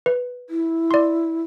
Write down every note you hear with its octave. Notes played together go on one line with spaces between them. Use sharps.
B4
E4
D5 C6